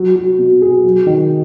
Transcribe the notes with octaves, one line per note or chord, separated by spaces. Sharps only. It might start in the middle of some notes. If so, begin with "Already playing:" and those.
Already playing: F#3
F#3
B2
G#4
F#3
D#3